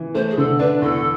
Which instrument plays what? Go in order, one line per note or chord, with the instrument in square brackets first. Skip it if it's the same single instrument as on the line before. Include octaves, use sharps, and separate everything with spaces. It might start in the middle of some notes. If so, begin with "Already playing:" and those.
Already playing: [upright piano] E3
[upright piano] A3 [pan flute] C5
[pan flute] G#4
[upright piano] D3 [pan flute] A4
[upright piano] D4 [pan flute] B4
[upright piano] E2 [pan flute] A4